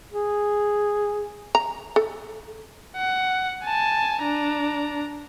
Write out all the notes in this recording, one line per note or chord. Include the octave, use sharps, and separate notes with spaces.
G#4
A#5
A4
F#5
G#5 A5
D4 A#5